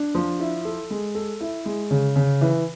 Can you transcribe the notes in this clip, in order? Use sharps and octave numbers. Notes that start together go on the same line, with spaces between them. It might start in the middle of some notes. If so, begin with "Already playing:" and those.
Already playing: D4
F3
E4
A4
G#3
A4
E4
G#3
C#3
C#3
E3